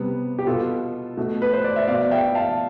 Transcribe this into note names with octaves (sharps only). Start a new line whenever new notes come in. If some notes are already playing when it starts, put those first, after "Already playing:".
Already playing: C3 G3 B3
G4
B2 B3 F4 A4
B2 A3
B4
C5
D5
E5
B2 B3 D5 F5
E5 G5
F5 A5